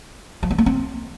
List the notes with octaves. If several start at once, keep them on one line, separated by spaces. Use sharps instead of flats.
F3
B3
A#3
C4